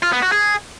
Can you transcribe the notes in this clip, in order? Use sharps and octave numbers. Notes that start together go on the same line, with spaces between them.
F4
B3
F#4
G#4